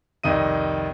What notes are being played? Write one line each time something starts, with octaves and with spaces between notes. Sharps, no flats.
C2 F2 D#3 D#5 D#7